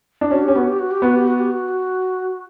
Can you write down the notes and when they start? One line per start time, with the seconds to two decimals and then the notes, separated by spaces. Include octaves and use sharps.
0.21 D4
0.31 C#4 F#4
0.43 G4
0.48 C#4
0.56 B3 F#4
0.68 G4
0.79 F#4
0.91 G4
1.02 B3 F#4
1.16 G4
1.27 F#4
1.40 G4
1.51 F#4